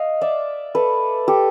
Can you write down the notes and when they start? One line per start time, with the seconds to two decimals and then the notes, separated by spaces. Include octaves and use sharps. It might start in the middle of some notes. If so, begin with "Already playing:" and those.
Already playing: D#5 F5
0.21 D5 E5
0.75 A4 B4
1.28 G4 A4